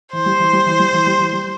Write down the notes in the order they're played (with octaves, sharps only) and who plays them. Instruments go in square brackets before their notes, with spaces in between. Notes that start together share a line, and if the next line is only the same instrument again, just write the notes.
[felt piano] E3 [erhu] C5
[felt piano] G3
E3
G3
E3
G3
E3
G3
E3
G3